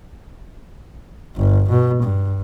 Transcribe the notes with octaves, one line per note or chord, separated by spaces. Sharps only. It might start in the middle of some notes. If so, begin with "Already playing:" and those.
G1
B2
G2